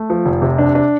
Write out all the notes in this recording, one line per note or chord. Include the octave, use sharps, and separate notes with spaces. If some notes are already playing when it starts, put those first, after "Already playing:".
Already playing: A3
F3
F1
C3
D4
D4